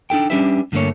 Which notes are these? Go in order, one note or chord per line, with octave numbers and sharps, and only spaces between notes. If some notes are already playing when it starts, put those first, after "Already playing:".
D4 D#4 A4 G5
G3 C#4 D4 G4 B4 E5
G2 D3 F#3 A3 A#3 C#5